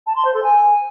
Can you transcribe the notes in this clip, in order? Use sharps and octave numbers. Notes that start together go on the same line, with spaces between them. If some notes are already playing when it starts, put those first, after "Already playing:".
A5
C6
C5
A4
G#5